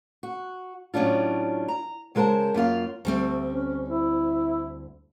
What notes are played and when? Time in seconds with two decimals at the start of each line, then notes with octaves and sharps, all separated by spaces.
0.23 F#4
0.94 A2 F#3 C#4 D4 F4
1.68 A#5
2.15 C#3 G#3 F4 A#4 C5 A5
2.54 F#2 A#3 F4 F5
3.05 D2 G3 A3 C4
3.49 C#4
3.89 E4